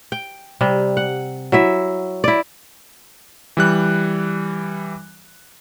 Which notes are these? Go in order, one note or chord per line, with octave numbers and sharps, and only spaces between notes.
G5
C3 G3
F#5
F#3 E4 E5
E4 D5
E3 G3 F#6